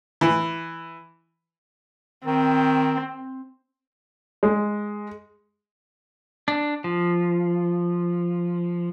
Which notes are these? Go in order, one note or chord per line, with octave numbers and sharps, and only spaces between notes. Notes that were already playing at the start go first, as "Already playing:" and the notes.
E3
D#3 C4
G#3
D4
F3